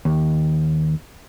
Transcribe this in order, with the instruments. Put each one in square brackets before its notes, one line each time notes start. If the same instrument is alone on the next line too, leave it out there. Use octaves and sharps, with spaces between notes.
[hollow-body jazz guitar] D#2